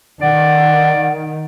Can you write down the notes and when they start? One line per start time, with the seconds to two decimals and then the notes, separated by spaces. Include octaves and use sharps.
0.22 D#3 D5 F#5